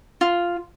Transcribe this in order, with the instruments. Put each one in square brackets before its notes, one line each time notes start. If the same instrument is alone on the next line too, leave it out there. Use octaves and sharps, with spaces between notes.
[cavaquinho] F4